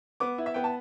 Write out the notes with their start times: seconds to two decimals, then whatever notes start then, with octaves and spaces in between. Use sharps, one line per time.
0.20 B3 D6
0.38 E4
0.46 E5
0.54 B3 G5
0.64 A5